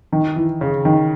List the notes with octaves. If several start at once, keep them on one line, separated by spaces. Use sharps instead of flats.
D#3
E3
C#3
D#3